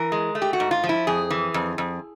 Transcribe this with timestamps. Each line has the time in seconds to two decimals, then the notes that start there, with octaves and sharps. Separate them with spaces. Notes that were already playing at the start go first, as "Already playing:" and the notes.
Already playing: E3 A#4
0.12 G#3
0.35 A3
0.42 G4
0.53 F#4
0.60 G#2
0.71 F4
0.84 F3
0.89 E4
1.07 F2 G#4
1.30 E3
1.54 F2
1.78 F2